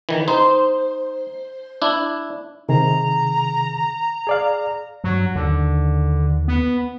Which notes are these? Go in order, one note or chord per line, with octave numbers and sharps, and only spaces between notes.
D#3 E3
D#4 C5
D4 E4
C3 D#3 G#4 A#5
G#4 D5 F5
G2 F#3
D#2 D3
B3